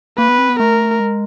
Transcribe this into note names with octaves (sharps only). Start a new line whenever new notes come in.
A#3 B4
B3
C4
B3
A3 A#4
G#3